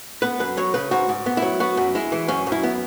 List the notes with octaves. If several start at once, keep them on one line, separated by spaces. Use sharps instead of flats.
B3 B4
F#2 B4
F#3 C#5
C#3 B4
G#2 F#4
G#2
B3
E4
F#3
B3 F#4
F#2
G#3 E4
E3
F#2 C#4
F#2
E4
B3